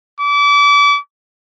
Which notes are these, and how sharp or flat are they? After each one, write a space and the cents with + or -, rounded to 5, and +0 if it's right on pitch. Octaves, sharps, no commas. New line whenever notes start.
D6 -35